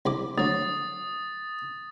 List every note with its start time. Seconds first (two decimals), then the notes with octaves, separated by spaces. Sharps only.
0.06 C2 B5 D6
0.38 D2 F#3 D#6 A6